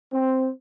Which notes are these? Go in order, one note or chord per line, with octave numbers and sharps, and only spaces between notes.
C4